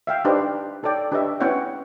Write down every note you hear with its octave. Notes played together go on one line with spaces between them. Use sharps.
E5 F5 G5
D4 D#4 G4 B4 C5 D#5
D#4 A4 C#5 D5 G5
D4 G4 B4 C#5 D#5 E5
B3 C#4 E4 C#5 F#5 G5